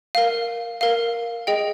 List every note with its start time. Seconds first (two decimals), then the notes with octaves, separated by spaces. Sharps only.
0.15 A#4 F5
0.81 A#4 F5
1.47 G#4 D#5 G5